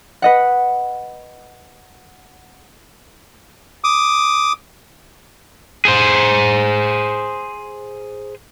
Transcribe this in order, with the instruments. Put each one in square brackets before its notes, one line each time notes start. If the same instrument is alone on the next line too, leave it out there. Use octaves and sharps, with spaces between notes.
[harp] B4 D#5 F#5
[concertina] D6 D#6
[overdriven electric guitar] G#4 C5